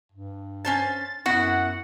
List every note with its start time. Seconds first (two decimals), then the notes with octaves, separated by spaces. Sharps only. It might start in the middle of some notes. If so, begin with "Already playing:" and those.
0.12 G2
0.65 C#4 C5 A5 A6
1.26 F#2 B3 E4 F#4 F#5